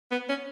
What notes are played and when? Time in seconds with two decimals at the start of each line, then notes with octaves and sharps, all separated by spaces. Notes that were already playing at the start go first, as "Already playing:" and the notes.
0.11 B3
0.29 C#4